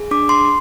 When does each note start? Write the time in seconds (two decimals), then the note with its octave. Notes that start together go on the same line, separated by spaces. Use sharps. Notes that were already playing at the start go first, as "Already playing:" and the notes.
Already playing: G#4
0.11 D4 D6
0.29 C6